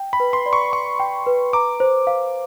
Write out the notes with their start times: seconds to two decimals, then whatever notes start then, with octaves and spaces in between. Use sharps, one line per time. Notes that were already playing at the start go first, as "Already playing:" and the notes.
Already playing: G5
0.13 B5
0.20 B4
0.33 C6
0.46 D5
0.53 C#6
0.73 B5 C#6
1.00 G5
1.26 B4
1.53 A#5 D6
1.80 C5
2.07 F5